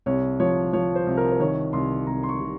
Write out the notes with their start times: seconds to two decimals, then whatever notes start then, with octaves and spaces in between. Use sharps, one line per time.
0.06 C2 C#5
0.40 F3 C#5
0.73 F3 C#5
0.96 C5
1.06 C2
1.17 A#4
1.31 C5
1.40 D#3 C#5
1.73 C2 C6
2.07 C2 A#5
2.23 C6
2.29 C#6
2.40 C3